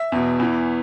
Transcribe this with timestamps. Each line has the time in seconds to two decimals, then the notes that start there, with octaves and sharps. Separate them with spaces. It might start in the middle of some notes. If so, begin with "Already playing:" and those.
Already playing: E5
0.12 E2 B2
0.40 E2 E3